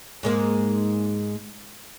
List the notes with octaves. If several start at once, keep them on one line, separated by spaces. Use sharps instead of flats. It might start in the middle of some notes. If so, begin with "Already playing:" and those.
G#2 G#3 A#3